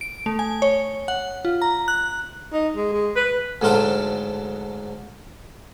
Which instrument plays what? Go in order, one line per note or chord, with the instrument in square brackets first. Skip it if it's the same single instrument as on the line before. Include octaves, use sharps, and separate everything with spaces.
[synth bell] D7
A3
G#5
C#5
F#5
F4
A#5
F#6
[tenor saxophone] D#4
G#3
G#3
B4
[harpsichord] D2 G#2 F#3 F4 A4 G5